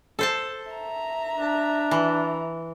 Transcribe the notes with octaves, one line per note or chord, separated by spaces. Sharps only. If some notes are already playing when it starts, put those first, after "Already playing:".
A4 C5 A5
E5 A#5
D4
E3